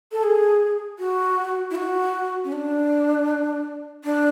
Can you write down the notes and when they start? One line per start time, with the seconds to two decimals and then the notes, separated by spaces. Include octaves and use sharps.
0.12 A4
0.23 G#4
0.99 F#4
1.71 E4
1.75 F#4
2.44 C#4
2.52 D4
4.04 D4